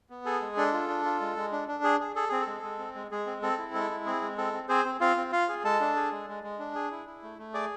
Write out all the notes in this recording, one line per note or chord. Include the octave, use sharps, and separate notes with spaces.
B3
G#4 A4
G#3
D4 A4
F4
D4
F4
G#3
G#3
D4
D4
G#4
G#4
G#4 A4
C4 G#4
A4
G#3
G#3
C4
G#3
G#3 G#4
C4
C4 A4
E4
G#3 A4
E4
C4 G#4
G#3
C4 A4
C4
C4 G#4 C5
C4
C4 F4 F5
C4
F4 F5
G#4
G#3 A4 A5
D4
G#4
G#3
G#3
G#3
D4
G#4
E4
E4
A3
A3
G#4 D5 D6